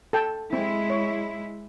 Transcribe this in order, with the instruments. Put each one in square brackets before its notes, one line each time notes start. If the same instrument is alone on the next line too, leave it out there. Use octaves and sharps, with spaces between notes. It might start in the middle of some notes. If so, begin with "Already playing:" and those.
[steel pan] A4 G5 A5
[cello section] G#3 E4 [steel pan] C4
[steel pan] C#5